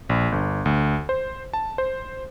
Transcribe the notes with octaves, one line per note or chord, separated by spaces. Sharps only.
A#1
G1
D2
C5
A5
C5